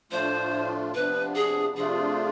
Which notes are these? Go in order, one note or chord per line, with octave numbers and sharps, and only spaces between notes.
A2 F3 A3 D4 F4 C5
C3 F3 B3 D4 B4
G#4
C3 F3 A3 D4 F4 G#4